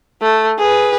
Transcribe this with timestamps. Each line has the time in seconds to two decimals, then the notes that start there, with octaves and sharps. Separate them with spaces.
0.22 A3
0.59 G#4 B4